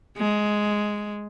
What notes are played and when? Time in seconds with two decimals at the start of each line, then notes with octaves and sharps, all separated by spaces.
0.18 G#3